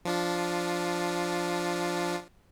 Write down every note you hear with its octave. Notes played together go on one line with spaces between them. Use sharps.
F3 D4 F4